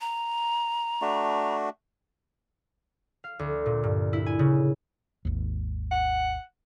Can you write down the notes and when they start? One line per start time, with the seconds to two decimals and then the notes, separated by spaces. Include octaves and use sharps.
0.01 A#5
1.01 A3 D4 F#4
3.24 F5
3.39 D2
3.66 A#2
3.84 G2
4.13 E4
4.26 G#5
4.39 C#3
5.25 G#1 D#2
5.91 F#5